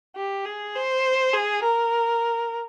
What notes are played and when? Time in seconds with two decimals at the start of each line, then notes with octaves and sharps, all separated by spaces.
0.16 G4
0.45 G#4
0.75 C5
1.34 G#4
1.63 A#4